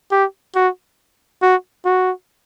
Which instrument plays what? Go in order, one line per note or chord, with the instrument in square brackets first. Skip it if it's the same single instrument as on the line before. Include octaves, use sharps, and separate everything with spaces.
[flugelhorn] G4
F#4
F#4
F#4